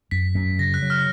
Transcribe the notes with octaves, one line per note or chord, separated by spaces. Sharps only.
F#2 B6
F#2
C#3 A#6
F#6
F#3
F6